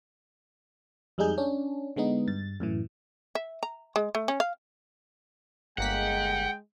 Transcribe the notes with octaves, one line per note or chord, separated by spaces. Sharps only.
F2 G3 G#3 D#4 G#4 G6
C#4 D4
D3 G#3 B3 D#4
G2 A6
F#2 A2 E3
E5
A#5
G#3
A3
C#4
F5
G1 G#3 A#3 F#5 G5 B6